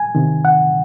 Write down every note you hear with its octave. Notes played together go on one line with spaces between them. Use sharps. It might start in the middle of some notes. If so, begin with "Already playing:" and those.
Already playing: G#5
C3 D#3
F#5